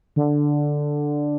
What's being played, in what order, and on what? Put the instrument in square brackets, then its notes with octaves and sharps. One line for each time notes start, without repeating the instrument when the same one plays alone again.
[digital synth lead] D3